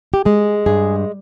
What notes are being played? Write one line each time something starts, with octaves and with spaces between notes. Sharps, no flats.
G4
G#3 G#4
G2 G#4